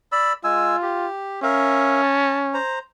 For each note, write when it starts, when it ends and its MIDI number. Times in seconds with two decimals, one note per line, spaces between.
0.12 0.33 74
0.12 0.33 83
0.12 0.33 88
0.44 0.76 56
0.44 1.07 65
0.44 0.76 80
0.44 0.76 88
0.82 1.40 67
1.43 2.58 61
1.43 2.02 70
1.43 2.02 76
1.43 2.02 77
2.02 2.39 81
2.54 2.79 72
2.54 2.79 82